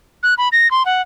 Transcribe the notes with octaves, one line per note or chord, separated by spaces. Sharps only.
F#6
B5
A#6
C6
F#5